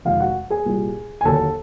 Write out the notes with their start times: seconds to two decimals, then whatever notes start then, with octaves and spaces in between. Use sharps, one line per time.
0.05 F2 C3 D#3 G#3 F4 F5
0.20 F#4 F#5
0.50 G#4 G#5
0.66 C2 A#2 G3
1.21 G#5
1.25 D#2 D3 F#3 A4 A5